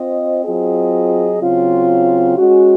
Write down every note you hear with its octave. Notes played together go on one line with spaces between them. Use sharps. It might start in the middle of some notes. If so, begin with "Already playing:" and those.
Already playing: C4 F4 C5 D#5
F#3 C4 F4 G#4 D#5
C#3 F#3 C4 F4
G#3 C#4 F#4